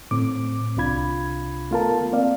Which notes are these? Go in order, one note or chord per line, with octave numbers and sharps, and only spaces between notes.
A2 C4 D6
C2 C3 D4 F4 B5 G#6
A3 B3 F4 A4 A#4 A5
A#3 C4 D5 F5